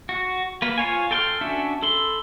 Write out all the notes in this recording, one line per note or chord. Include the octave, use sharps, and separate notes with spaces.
F#4
A#3 B4
F4 C5 C#5 G#5
A4 G5 C6 C#6 F6
C#4 D4 F#4 E5 A5
A4 B5 C6